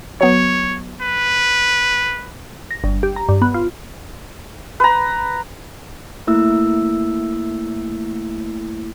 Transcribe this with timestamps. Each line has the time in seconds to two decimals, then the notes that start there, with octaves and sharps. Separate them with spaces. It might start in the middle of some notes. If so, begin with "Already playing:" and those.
0.21 F#3 B3 C#5
1.01 B4
2.71 A#6
2.84 G1
3.03 G4
3.16 A#5
3.29 G2
3.42 B3
3.54 F4
4.80 B4 A#5
6.27 A3 A#3 E4 E6